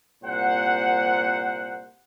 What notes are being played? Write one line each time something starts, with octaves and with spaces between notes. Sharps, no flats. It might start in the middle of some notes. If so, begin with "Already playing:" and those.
C2 A#2 C5 F#5